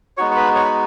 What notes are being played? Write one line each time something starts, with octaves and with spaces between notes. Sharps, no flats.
G#3 B3 D#4 F#4 C#5 C#6
C#6
B4 B5
C#5 C#6
B5